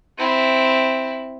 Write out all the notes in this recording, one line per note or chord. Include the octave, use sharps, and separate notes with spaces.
C4 E4